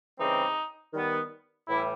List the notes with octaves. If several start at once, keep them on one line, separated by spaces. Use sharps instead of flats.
C#3 E3 G3 C4 D#4
D#3 G3 B3
A2 E3 G3 E4